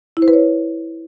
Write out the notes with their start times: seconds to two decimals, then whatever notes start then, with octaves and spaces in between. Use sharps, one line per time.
0.17 E4
0.22 C5
0.28 B4
0.33 C#5